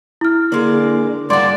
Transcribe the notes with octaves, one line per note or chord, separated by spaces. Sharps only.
E4 F6
D3 G#3 A#3 D5
G#2 G3 A#3 D4 D5 F#5 C6